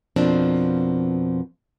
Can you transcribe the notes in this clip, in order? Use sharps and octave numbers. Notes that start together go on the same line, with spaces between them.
F2 B2 F3 A#3 C4 D4